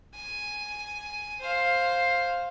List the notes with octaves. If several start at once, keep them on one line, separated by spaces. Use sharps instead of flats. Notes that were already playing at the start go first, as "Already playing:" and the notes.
G#5
C5 F5